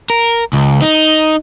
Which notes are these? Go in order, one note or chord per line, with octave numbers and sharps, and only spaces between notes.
A#4
C#2
D#4